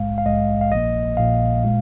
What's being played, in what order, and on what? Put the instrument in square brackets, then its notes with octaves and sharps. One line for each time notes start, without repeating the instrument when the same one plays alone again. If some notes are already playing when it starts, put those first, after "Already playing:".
Already playing: [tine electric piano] A#1 G#2 G#3 F5
F5
A#1 G#2 G#3 D#5
F5
A#1 A#2 F3 A#3 D#5
A#1 A#2 F3 A#3 F5
A#2 G#3